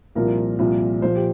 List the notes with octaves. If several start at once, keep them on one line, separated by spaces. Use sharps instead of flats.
C2 A#2 F3 A#4
C2 A#2 F3
A#1 A#2 F3 C5
G4